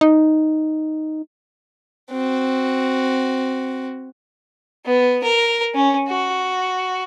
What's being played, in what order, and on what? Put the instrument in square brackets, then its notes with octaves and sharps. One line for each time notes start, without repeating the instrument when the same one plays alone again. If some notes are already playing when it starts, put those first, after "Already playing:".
[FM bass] D#4
[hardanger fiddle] C4 F#4
[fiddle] B3
A#4
C#4
F#4